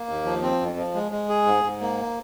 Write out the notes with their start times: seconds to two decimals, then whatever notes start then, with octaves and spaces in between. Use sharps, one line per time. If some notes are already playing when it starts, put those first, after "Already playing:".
Already playing: A#3
0.09 D#2
0.25 F3
0.43 C4
0.61 F2
0.78 F3
0.95 G#3
1.12 G#3
1.29 G#4
1.46 G#2
1.64 G#2
1.81 A#3